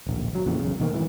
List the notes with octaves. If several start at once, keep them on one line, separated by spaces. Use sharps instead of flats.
D1 A#1
G1 F#3
F2 A#2 C#3 E3
E1 B1 C#3
B2 D#3 A#3
G#2 D#3 E3